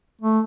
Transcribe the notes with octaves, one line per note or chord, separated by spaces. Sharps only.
A3